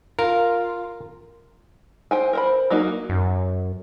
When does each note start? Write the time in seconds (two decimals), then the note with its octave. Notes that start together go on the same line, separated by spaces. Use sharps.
0.19 F4 A#4
2.11 C5 G5 G#5
2.33 A#4 C5 B5
2.70 F#3 A#3 D#4 F#4
3.09 F#2